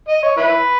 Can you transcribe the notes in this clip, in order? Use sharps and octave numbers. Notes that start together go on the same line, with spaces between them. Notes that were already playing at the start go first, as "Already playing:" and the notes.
D#5
C#5
E4 B4